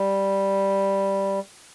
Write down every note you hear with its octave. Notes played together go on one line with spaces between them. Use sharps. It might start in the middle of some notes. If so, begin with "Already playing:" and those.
Already playing: G3